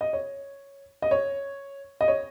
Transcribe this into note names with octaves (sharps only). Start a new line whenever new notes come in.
D#5
C#5
D#5
C#5
D#5
C#5